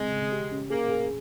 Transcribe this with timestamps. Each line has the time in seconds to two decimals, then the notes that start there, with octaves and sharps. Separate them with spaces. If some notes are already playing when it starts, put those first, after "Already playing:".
Already playing: C#3 G#3 C4
0.13 C#3
0.32 G4
0.52 C#4
0.70 A#3 G#4
0.91 G#4